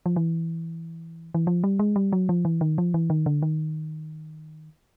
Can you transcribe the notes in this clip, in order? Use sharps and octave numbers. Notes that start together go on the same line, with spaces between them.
F3
E3
E3
F3
G3
G#3
G3
F#3
F3
E3
D#3
F3
E3
D#3
D3
D#3